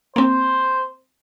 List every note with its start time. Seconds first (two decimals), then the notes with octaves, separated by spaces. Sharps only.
0.16 A#3 C4 C5